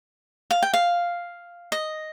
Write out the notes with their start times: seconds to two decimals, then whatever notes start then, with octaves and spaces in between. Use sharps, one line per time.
0.51 F5
0.63 G5
0.74 F5
1.72 D#5